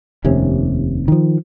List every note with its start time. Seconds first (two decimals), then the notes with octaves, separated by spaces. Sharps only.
0.24 F1 D#2 C3 C#4
1.08 D#3 F3